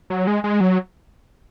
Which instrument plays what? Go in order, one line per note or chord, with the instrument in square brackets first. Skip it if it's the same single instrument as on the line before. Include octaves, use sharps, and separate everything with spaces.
[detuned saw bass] F#3
G#3
G#3
F#3